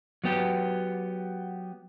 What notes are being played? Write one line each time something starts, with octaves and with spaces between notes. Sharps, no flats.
F#3 B3 G4